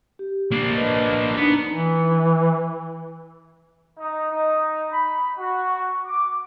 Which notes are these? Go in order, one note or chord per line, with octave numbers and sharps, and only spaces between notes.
G4
A#3 D4
B4 D#5
B3 D4 D#4 A#5
E3
D#4
D#4
B5
F#4
D6